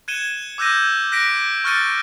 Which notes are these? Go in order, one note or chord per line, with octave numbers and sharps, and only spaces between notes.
F#6 G#6 C#7 D#7 E7 G7
D6 E6 F#6 G6 A#6 D#7
F#6 A#6 B6 D7
C#6 F6 F#6 A6 C#7 D#7